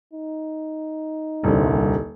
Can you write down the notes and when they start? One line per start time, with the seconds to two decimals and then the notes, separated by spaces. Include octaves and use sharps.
0.13 D#4
1.44 D#1 C2 D3